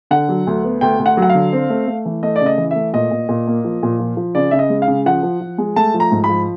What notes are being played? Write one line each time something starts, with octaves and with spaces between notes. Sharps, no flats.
D3 F#5
F#3
D2
B3
D2 G5
D2
F#5
F#3
F#5
F5
D3
C4
A3
A3
E3
A3 D#5
D5
C#3
D#5
E3
A3 E5
A#2 D#5
A#2
A#2
A#3
F3
A#2
F3
F3
C#3 D5
C#3 E5
D#5
G#3
F5
C#3
F3 F#5
F3
F3
G#3
A3 A5
F3
A#5
G#2
B5
F3